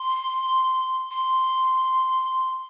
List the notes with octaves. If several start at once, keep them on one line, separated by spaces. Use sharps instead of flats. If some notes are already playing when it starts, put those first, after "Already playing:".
Already playing: C6
C6